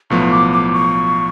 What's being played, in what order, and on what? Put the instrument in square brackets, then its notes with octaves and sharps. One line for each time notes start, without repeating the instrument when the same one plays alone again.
[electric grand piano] B1 A2 F3 B3 [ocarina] C#6
[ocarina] D6
D6
C#6